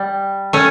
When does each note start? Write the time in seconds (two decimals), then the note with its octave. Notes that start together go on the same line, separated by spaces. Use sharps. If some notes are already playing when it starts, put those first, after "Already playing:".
Already playing: G3
0.53 A3 C#4